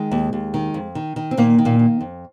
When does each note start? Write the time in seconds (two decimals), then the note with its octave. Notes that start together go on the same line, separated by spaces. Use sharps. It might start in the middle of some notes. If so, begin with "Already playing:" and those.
Already playing: D#3 G#3
0.11 D#2
0.33 D#2
0.54 D#3
0.74 F2
0.95 D#3
1.16 D#3
1.31 C4
1.37 A#2 D#3 A#3
1.58 D#3
1.65 A#2 A#3
1.79 D#3
2.01 F2